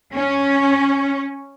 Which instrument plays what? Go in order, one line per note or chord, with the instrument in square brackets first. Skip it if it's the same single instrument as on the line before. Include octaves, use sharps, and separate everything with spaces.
[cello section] C#4